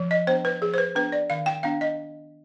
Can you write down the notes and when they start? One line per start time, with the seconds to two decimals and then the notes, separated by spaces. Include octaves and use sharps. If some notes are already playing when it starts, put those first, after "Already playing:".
Already playing: F3
0.11 D#5
0.27 B3 D4 C5
0.45 B4
0.61 F3 G#4
0.74 C5
0.78 B4
0.95 B3 D4 B4
1.12 D5
1.30 D#3 F5
1.46 G5
1.63 B3 D4 F5
1.81 D#5